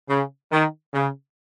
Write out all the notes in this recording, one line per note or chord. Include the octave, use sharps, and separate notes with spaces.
C#3
D#3
C#3